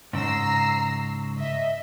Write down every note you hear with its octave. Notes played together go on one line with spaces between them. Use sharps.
G#2 C#3 A#5 E6 C7
D#5 E5